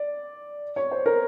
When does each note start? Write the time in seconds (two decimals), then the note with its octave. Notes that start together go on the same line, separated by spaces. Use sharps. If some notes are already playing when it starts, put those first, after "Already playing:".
Already playing: D5
0.76 C#5
0.91 C5
1.06 A#4